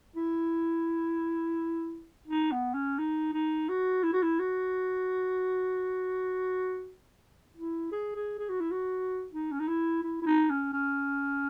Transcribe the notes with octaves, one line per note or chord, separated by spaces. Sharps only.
E4
D#4
B3
C#4
D#4
D#4
F#4
E4
F#4
E4
F#4
E4
G#4
G#4
G#4
F#4
E4
F#4
D#4
C#4
D#4
E4
E4
E4
D#4
C#4
C#4